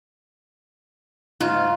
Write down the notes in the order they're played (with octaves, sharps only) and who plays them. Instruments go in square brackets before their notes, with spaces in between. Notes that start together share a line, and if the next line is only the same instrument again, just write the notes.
[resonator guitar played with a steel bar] G#2 [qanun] F4